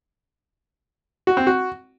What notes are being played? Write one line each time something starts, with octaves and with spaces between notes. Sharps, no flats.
F#4
C4
F#4